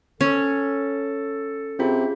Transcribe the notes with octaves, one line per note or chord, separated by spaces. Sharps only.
C#4 A4
C3 C#4 F4 G#4